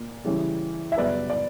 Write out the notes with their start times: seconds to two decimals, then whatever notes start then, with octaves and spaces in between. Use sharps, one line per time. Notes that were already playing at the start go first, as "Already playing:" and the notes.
Already playing: A#2 A#3
0.24 C#3 E3 G3 C#4
0.92 E5
0.97 F#2 C#3 G3 B3 B4 D5
1.30 D5